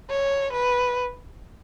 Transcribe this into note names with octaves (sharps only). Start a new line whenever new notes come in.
C#5
B4